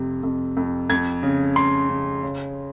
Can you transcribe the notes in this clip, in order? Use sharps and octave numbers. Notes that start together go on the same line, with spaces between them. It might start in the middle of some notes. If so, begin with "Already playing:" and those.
Already playing: F2 C3
F2
F2
F2 G#6
C#3
C#3 C6
C#3
C#3